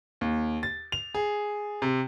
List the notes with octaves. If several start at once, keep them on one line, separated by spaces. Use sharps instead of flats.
D#2
A6
F7
G#4
C3